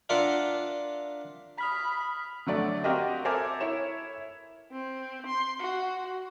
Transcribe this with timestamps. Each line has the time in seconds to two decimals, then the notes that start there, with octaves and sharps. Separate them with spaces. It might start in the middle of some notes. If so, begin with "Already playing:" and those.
0.09 D4 F4 A#4 E5 F#5
1.58 B5 D#6 F6 B6
2.47 D3 F#3 A3 D5
2.84 C4 F#4 G4 A#4 D#5 F5
3.25 A4 A#4 C5 E5 G#5 D6
3.60 E4 C#5 E7
4.72 C4
5.26 C6
5.60 F#4